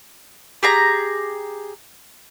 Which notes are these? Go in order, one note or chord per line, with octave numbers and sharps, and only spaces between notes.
G4 G#4 A#5